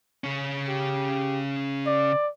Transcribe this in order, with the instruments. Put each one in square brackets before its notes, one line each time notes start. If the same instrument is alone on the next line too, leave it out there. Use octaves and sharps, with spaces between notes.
[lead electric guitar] C#3 C#4
[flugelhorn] G4
D5